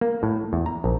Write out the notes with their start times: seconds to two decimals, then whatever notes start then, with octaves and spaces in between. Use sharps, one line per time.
0.01 A#3
0.23 A2
0.53 E2
0.66 A#5
0.84 A#1